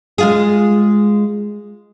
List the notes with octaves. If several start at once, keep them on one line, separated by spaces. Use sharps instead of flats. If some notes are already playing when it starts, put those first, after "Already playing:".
G#3 F4 G#4